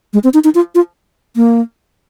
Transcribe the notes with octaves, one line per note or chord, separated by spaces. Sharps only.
G#3
C4
D#4
D#4
F4
F4
A#3